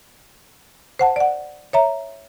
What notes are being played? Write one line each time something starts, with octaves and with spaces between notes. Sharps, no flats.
C5 F#5 A5
D5 F#5
C#5 E5 A#5